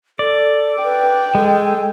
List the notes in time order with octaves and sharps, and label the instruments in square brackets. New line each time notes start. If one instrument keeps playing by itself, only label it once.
[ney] A4 [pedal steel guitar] D5
[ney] B4 [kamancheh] G5
[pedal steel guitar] G#3 [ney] A4